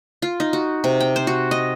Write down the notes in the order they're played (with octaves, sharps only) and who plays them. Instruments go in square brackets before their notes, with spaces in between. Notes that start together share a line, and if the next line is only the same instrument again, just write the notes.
[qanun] F4
D#4
F#4
C3
G5
C5
F#4
D#5